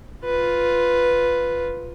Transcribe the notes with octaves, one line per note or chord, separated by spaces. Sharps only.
F4 B4